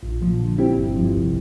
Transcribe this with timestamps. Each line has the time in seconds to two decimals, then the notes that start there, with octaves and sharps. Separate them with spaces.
0.03 A#1
0.21 A#2 F3
0.39 D3
0.58 G3 C4 E4 G4
0.77 G1
0.96 G2 F3
1.14 C2